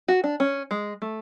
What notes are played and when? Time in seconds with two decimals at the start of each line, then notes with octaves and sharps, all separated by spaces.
0.08 F#4
0.24 D4
0.40 C#4
0.71 G#3
1.02 A3